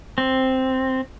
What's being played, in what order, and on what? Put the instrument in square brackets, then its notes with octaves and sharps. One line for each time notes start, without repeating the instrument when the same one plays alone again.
[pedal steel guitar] C4